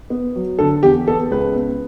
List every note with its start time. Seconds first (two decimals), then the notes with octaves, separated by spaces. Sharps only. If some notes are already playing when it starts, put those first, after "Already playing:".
0.10 B3
0.36 F#3
0.59 D3 A4
0.83 E2 G4
1.08 B3 A4
1.31 C#2 B4
1.55 B3